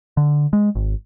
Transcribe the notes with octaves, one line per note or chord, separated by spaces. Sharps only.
D3
G#3
G#1